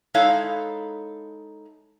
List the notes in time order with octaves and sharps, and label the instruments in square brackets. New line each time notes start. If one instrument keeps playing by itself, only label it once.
[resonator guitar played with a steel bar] G#3 D#4 E4 A4 C#5 F5